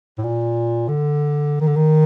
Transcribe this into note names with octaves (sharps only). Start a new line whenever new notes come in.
A2
A#2
D3
D#3
D3
D#3